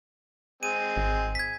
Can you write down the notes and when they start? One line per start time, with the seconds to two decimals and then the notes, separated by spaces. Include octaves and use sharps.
0.63 G#3 C4 G#5 D#7
0.97 G#1
1.35 G#6 B6